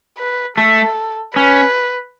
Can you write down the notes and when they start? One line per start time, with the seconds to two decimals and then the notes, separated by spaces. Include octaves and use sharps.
0.18 B4
0.57 A3 A4
1.35 C#4 B4